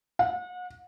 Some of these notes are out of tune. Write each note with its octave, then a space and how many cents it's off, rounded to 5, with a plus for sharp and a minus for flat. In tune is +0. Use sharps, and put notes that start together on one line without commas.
F#5 -35